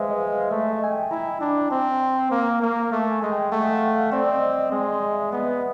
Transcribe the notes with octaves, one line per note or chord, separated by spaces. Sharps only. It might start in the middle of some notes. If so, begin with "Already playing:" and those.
Already playing: G#3 B4 C5 E5 F5
D#5
F5
A3 E5
D#5
G#5
G5
E4 A#5
D4
C4
A#3
A#3
A3 A5
G#5
G#3
G5
A3 F#5
F5
F#5
F5
C4 D5
D5
D#5
D#5
G#3 D#5
D#5
E5
B3